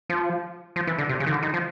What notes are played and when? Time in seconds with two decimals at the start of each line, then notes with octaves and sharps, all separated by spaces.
0.09 F3
0.76 F3
0.87 E3
0.98 D3
1.09 C3
1.20 C#3
1.26 D#3
1.32 D3
1.43 D#3
1.54 F3